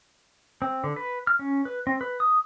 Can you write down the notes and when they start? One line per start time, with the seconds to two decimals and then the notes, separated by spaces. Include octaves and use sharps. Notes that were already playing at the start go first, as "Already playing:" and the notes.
0.62 C4
0.84 D3
0.96 B4
1.27 F6
1.39 C#4
1.65 B4
1.87 C4
2.01 B4
2.20 D#6